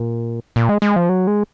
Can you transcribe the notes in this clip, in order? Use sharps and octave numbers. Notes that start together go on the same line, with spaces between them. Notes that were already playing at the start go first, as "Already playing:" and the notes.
Already playing: A#2
A#2
G#3
G#3
F3
F#3
G#3